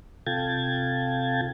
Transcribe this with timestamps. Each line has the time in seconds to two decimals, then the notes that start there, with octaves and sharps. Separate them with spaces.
0.27 C3 F4 A4 G5 G#6 A6